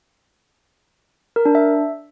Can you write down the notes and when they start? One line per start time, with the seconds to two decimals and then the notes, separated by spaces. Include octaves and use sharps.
1.36 A#4
1.45 D4
1.55 E5